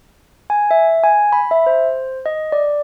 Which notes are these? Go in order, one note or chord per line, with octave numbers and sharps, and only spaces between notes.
G#5
E5
G#5
B5
E5
C5
D#5
D5